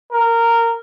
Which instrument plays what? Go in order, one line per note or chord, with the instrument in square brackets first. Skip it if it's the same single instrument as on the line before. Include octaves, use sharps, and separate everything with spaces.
[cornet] A#4